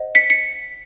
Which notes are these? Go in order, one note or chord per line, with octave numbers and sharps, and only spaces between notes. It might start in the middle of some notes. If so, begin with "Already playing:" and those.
Already playing: C5 D#5 F#5
B6 C#7
B6 C#7